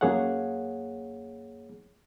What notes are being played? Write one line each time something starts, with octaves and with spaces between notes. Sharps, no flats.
F#2 A#3 G#4 C#5 F5 F#5